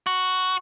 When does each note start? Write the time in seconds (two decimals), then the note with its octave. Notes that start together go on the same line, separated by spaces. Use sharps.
0.07 F#4